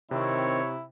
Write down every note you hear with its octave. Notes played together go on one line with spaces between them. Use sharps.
C3 D#3 C4 E4 C#5